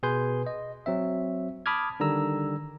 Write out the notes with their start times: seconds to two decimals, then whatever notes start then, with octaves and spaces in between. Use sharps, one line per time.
0.03 B2 G#4 B4 G#5 C6 G6
0.46 D#5
0.86 F#3 C4 E5
1.66 A5 B5 D6 D#6 F6 G#6
2.00 D3 D#3 G3 A#5 E6